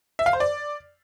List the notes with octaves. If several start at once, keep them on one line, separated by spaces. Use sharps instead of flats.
E5
F5
C5
D5